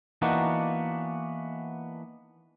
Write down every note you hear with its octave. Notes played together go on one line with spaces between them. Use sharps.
E3 A#3 B3 D4 D#4 F#4